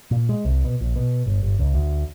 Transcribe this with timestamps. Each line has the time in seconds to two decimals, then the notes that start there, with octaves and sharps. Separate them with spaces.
0.11 A#2
0.29 G#3
0.45 C2
0.64 B2
0.81 A#1
0.96 B2
1.26 G1
1.43 G1
1.59 C#2
1.74 D2